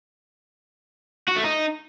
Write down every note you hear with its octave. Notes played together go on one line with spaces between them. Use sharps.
F#4
A3
D#4